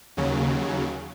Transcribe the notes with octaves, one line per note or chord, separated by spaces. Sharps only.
D#2 C#3 F#3